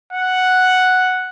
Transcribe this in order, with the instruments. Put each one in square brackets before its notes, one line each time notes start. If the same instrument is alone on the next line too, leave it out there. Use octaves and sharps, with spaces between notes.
[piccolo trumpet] F#5